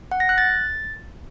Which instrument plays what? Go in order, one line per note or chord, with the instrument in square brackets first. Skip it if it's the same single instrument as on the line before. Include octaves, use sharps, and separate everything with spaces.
[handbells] F#5
A#6
F#6
A6